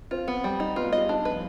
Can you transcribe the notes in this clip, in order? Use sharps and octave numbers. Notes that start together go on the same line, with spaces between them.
C4 F4 C5
B3
G3
D#4
B3 F4 B4
G#3 G#4
D#5
G3 G4
D4 D#4
D#4
B4
F3 F4